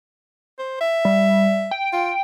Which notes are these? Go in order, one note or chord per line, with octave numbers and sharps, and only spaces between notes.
C5
E5
G3
G5
F4